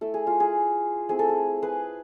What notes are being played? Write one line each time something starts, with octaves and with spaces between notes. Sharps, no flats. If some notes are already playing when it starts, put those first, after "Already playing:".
A3 E4 A4
G#4
F4
G#4
A3 C4 E4 G#4
A4
G#4
G#4 B4